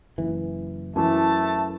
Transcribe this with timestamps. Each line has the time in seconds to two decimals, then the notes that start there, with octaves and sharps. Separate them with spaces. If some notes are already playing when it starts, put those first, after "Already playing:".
0.18 F#1 E3
0.96 F#2 E3 A3 A5